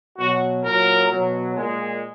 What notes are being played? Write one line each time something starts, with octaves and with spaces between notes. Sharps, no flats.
B2 F#3 F#4
A#2 F#3 A#4
B2 F#3
A#2 G#3